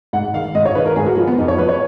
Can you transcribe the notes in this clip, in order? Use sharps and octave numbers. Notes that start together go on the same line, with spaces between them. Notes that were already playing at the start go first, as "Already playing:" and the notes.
G#2 F#5
D#3 F5
G#2 D#5
C#5
D#3 B4
A#4
G#2 G#4
F#4
F3 F4
B3
F2 D#4
C#5
F3 B4
C#5